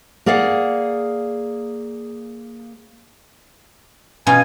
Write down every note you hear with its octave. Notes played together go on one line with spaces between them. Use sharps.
A#3 G#4 D5 F5 F#5
B2 C#4 F4 G#5